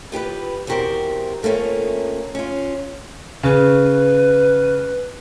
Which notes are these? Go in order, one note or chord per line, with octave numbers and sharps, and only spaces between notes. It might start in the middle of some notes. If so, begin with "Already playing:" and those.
F4 G4 A4 B4
E2 C4 F#4 G4 A#4 C5
A3 A#3 C4 C#4 F4
C#4 F4
C#3 B4